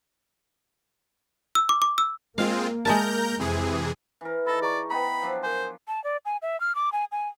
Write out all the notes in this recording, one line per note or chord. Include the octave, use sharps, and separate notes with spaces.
E6
D6
D6
E6
G#3 A#3 C4 F4 F5
G#3 A#4 E5 A5 A#5 G6
F2 C3 E3 G#4
E3 A#4
D#4 A4 A5 B5 A#6
G#4 D5 A#5 C#6
B3 D#4 G5 A#5 B5
F3 F#3 D4
A#4 C5 G#5
A5
D5
G#5
E5
F6
D6
G#5
G#5